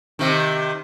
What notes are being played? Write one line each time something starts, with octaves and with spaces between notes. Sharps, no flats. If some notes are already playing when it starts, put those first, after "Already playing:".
C3 D#3